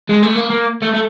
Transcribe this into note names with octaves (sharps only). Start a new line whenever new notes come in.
G#3
A3
A#3
A#3
A3
A3